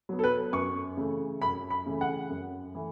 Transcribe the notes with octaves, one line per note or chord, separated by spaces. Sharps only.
F#3 B3
A4
B4
F#2 C#6
C#3 E3 A3
F#2 B5
B5
C#3 E3 A3
F#5
F#2
E3 A3